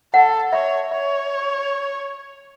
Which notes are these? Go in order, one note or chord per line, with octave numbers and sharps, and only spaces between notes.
A4 F#5
C#5 E5
C#5 E5